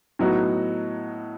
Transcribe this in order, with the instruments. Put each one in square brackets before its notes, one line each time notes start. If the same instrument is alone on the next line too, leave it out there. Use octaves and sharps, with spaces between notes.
[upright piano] A2 F#3 B3 D#4 F#4